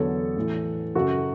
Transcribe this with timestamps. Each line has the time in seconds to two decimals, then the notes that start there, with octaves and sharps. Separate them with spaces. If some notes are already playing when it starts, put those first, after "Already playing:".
Already playing: E2 D3 F#3 A4 C#5
0.36 A2 E3
0.95 F#2 C#3 F#3 F#4 A4